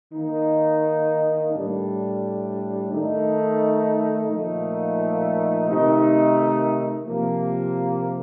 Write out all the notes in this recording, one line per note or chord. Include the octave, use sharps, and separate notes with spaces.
D#3 A#3 D#4
A2 G3 D4
D#3 A3 D#4
A#2 F3 A3 D#4
C3 D#3 A3 D#4
C3 F3 A#3